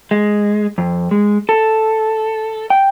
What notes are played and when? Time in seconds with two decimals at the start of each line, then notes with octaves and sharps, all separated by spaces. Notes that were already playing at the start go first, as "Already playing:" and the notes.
0.11 G#3
0.78 F2
1.11 G#3
1.49 A4
2.70 G5